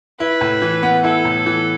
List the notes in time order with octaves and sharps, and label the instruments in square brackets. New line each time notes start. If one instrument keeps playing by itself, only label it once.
[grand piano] E4 [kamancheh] B4
[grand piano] A2
E3
B3
[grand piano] E4 [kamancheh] A4
[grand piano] A2
E3